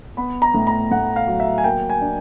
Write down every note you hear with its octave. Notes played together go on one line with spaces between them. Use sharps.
B3 B5
A#5
A2
A#5
A2 F#5
F5
F#3
E5
G#5
A#3 G5
G#5
D4